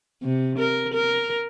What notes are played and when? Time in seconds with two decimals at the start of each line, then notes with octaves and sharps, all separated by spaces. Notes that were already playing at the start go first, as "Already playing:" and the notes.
0.23 C3
0.59 A#4
0.94 A#4